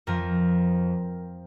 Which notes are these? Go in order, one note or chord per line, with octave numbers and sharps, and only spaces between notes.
F2 F3 A#4